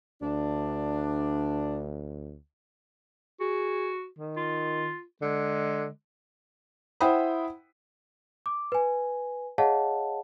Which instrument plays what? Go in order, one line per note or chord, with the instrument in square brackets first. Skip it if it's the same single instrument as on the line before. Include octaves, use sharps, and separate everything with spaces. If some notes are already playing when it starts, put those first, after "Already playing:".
[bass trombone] D2 [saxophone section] D4
[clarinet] F#4 [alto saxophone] G#4
[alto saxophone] D#3
[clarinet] F4
[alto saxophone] D3 [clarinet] G#3
[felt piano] E4 C5 F#5 G5 B5 D#6
[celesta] D6
B4 G#5
G#4 C#5 D#5 F5 F#5 A5